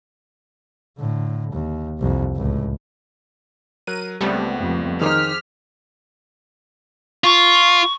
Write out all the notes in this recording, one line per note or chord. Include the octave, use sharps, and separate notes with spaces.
A2 D3
D#2
C2 F2
C#2 A2
F#3 A#4 F#6 D#7
C#2 G3 A3 B3 C4
F2
D#3 D#4 G#4 C5 D6 F6 B6
F4 C#6